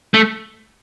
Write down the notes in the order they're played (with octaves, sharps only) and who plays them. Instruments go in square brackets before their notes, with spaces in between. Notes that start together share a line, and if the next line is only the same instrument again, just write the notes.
[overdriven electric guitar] A3